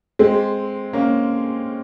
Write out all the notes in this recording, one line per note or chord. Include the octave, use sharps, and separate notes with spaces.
G#3 C4
A#3 C#4